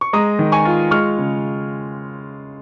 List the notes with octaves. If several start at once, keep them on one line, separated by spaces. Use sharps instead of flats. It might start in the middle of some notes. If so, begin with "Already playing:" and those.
C#6
G#3 A#5 D#6
D#3
G#5 C#6
F4
G#3 C#6 F6
C#3